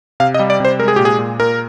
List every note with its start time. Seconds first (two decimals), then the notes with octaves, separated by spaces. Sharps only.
0.20 C3 F5
0.34 D#5
0.39 G3
0.50 D5
0.60 C3 C5
0.80 G#3 A#4
0.88 G#4
0.96 A#2 G4
1.05 G#4
1.19 A#2
1.40 A#2 A#4